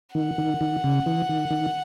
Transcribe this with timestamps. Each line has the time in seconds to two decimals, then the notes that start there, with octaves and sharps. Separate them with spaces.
0.15 D#3 F#5
0.38 D#3
0.61 D#3
0.84 C#3
1.06 E3
1.29 D#3
1.50 D#3